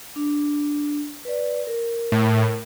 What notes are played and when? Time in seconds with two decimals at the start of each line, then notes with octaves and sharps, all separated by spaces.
0.16 D4
1.25 B4 D5
1.67 A#4
2.12 A2